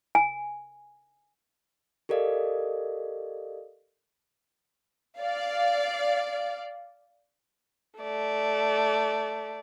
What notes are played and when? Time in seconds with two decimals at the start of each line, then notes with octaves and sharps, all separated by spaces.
0.15 G#5
2.09 G4 A4 A#4 D5 D#5 F5
5.18 D5 F5
8.00 A3 D5